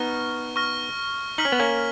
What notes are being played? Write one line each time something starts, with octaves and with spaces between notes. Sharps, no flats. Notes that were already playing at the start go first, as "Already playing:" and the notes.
Already playing: B3 D#4 C#6 F6 A#6
C#6 F6 A#6
D#4 F6 B6 F#7
C#4
B3
A#3 C#4